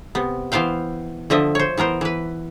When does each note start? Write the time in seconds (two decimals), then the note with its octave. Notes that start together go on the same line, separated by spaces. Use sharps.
0.15 C3 B3
0.52 E3 B3 C5 F5 G5
1.30 D3 F3 D#5 E5
1.55 C5 C#5
1.77 E3 B3 A#4 C5
2.01 E3 B4